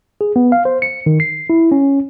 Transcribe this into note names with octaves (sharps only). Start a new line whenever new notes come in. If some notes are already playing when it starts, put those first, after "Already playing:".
G#4
B3
F5
C5
C#7
D#3
C7
E4
C#4